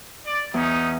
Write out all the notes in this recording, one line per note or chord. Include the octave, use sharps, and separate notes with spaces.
D5
E2 C#4 D#4